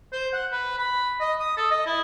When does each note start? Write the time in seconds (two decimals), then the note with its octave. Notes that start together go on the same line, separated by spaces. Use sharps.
0.13 C5
0.33 F#5
0.52 B4
0.78 B5
1.20 D#5
1.40 D#6
1.57 A4
1.71 D#5
1.86 E4